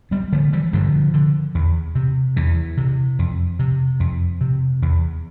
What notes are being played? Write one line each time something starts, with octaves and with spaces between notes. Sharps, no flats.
G3 B3
D3 F3 A3
E3 G3
G2 D3 F3
D3
E2
C3
E2 E3
C3
F2
C3
F2
C3
E2